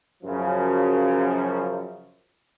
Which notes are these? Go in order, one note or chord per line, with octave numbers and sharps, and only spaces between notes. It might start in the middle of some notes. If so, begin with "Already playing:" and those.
F#2 C#3 F3